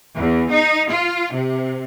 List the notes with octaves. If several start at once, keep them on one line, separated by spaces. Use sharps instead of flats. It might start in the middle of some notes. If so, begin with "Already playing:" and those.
E2
D#4
F4
C3